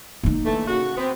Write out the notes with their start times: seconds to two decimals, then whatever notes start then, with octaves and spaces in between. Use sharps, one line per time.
0.23 A#3 D#4
0.45 D3 E3 A3
0.68 C#3 F#4
0.97 B3 C4